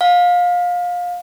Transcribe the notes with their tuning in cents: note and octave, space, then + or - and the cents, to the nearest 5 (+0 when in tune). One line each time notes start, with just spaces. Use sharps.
F5 +25